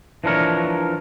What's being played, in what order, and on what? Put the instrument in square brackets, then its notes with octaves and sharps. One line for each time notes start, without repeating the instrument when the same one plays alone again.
[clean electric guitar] E3 F3 D4 A#4 C#5